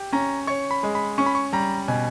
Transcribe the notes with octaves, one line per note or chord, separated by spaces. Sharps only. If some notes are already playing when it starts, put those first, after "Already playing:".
Already playing: G4
C#4 A#5
C#5 C#6
B5
G#3
B5
C#4 C#6
B5
C#6
G3 A#5
B2 G#5